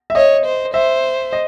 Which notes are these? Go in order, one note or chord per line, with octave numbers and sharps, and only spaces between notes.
E5
C#5 D#5
C5
C5 E5
D#5